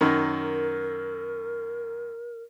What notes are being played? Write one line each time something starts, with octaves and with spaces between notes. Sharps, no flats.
F#2 D#3 A#4